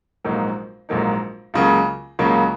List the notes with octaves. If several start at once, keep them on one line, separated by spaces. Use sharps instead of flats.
A#1 G#2 F#3 A#3 D#4
A#1 G#2 F#3 A#3 D#4
C#2 C#3 F#3 A#3
C#2 C#3 F#3 A#3